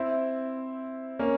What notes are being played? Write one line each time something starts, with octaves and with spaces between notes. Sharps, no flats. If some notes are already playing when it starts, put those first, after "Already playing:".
Already playing: C4 E4
A#3 C#4